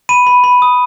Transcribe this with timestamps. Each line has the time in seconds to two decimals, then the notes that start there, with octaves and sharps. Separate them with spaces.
0.09 B5 D#7
0.27 B5
0.44 B5
0.62 D#6